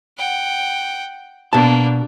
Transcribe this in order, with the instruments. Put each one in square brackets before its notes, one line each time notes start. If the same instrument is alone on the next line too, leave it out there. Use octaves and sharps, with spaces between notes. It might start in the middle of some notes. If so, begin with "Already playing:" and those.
[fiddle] F#5 G5
[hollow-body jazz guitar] B2 A5 [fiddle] A#3 D4